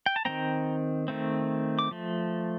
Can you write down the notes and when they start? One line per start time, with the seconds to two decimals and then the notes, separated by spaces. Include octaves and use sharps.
0.06 G5
0.16 A5
0.25 D#3 A3 C4 G5 A#5
1.08 D#3 A3 C4
1.79 D6
1.91 F3 A3